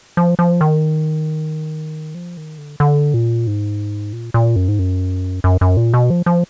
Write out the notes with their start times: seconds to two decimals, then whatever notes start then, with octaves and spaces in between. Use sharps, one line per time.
0.17 F3
0.39 F3
0.61 D#3
2.15 F3
2.37 D#3
2.58 D3
2.80 D3
3.14 A#2
3.47 G#2
4.13 A#2
4.34 A#2
4.56 F#2
4.68 G#2
4.79 F#2
5.44 F#2
5.61 F#2
5.77 A#2
5.94 B2
6.10 F3
6.26 F3